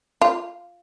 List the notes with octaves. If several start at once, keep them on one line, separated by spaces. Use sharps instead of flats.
F4